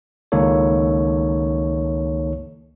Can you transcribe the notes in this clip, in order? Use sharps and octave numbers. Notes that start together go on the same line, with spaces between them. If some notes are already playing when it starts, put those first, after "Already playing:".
C#2 D#3 A#3 D#4 A4 C#5